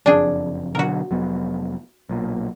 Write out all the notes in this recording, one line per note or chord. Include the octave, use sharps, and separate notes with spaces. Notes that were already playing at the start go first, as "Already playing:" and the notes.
F#1 F2 D4 G#4
B2 D3 F#3 F#4 A#4
F1 F#3 B3
B1 A#2